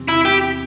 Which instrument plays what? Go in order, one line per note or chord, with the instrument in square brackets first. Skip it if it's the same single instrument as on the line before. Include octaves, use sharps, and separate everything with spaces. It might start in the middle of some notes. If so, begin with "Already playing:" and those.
Already playing: [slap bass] E2 C3 E3 C4
[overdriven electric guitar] E4
G4